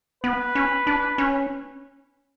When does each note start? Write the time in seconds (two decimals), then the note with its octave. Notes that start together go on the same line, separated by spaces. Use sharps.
0.23 B3 B4
0.55 C#4
0.87 D4
1.18 C#4